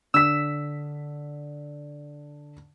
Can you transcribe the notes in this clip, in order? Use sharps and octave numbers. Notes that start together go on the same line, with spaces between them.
D3 E6 B6